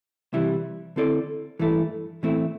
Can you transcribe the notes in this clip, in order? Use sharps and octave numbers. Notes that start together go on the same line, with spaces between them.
C2 C3 E3 G3 E4
D3 C4 E4 A4 D5
G2 E3 A3 E4 A4
A2 E3 A3 C4 E4